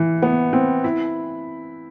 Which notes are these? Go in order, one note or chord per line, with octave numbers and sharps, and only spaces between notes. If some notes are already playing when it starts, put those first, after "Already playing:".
Already playing: E3
B3
C4
E4